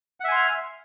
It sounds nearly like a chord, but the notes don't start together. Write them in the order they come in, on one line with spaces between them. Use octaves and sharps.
F#5 E5 G#5 C6 F6